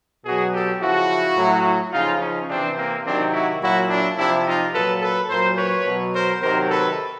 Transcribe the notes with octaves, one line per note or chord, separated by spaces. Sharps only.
B2 F#3 F#4 G#4
G4 A4
C#3 F3 E4 F#4
A2 F#3
C#3 F3 D#4 F4
C#4 D#4
C3 E3 C4 D4
A#3 C4
C3 D#3 F#3 C4 D4
E4 F#4
A#2 F#3 E4 F#4
D4 E4
C3 F3 D4 E4
D#4 F4
A#2 F#3 A4 B4
A4 B4
A#2 F#3 A#4 C5
B4 C#5
B2 F#3
A#4 C5
C3 D#3 F#3 A#4 C5
A4 B4